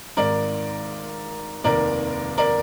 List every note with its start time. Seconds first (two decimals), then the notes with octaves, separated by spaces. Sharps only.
0.17 G#1 G#2 D#3 A#4 D5
1.64 F1 D#2 D#3 A#4 D5
2.38 A#4 D5